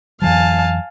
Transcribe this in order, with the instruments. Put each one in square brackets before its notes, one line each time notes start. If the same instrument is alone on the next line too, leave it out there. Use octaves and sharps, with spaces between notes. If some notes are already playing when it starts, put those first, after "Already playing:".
[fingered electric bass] F2 E3 F#3 [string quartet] F5 G#5 A5